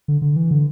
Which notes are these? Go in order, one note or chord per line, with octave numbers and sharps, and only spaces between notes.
D3
D3
E3
D3